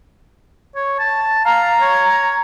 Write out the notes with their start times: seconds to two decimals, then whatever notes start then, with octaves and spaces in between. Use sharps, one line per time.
0.75 C#5
0.99 A5
1.45 F5 A#5
1.81 C#5